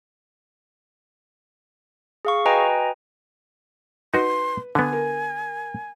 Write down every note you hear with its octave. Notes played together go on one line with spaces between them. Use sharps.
G#4 F5 C#6
F#4 B4 D#5 G5 G#5 A#5
D#4 F#4 B4 C6
D3 B3 G#5
A#4